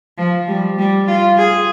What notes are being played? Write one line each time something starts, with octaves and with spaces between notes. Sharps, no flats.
F3
G3
G3
F4
G#4